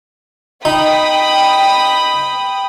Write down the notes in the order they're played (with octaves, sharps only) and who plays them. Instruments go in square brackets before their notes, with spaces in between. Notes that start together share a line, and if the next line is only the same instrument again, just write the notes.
[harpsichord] D#4 [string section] G5 B5 D#6